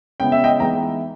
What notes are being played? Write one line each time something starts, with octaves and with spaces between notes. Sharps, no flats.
C#3 G#3 B3 E4 G5
E5
D#5 G5
E3 G#3 B3 D#4 G5 A#5